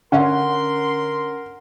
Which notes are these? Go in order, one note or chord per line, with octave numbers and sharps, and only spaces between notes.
D3 C#4 A#4 F#5 C6